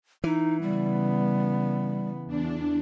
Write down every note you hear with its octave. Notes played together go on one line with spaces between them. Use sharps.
E3 D#4
C#3 G3 B3
E2 D4